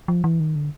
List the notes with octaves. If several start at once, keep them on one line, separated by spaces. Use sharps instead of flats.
F3
E3
D#3
D3